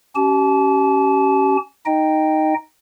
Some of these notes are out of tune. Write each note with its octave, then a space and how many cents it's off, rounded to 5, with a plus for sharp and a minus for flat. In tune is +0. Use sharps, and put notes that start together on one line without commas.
C#4 +0 G4 -35 A5 -35
D#4 +0 D#5 -5 G5 +0